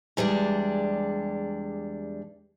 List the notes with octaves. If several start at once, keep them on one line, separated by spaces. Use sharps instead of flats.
E2 G3 G#3 D4